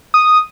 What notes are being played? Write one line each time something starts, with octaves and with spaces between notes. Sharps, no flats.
D#6